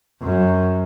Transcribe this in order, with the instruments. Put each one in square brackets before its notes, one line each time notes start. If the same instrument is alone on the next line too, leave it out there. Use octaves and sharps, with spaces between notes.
[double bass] F#2